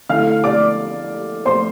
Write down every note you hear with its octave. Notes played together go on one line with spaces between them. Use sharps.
D3 A3 E4 F5 F6
D5 D6
C5 C6